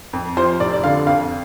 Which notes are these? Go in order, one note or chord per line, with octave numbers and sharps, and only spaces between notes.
F2
F3 C5
F1 D5
D5
D3 F5
F2 F5